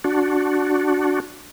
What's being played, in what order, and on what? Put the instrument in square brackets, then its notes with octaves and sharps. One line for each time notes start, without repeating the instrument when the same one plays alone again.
[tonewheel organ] D4 F#4